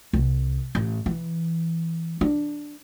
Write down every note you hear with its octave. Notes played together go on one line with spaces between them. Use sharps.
C2
A1
E3
D4